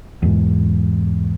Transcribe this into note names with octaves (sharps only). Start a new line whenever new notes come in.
E2 G#2